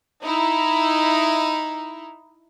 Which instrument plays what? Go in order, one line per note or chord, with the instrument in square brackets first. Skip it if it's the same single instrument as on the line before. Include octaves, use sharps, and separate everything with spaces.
[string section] D#4 E4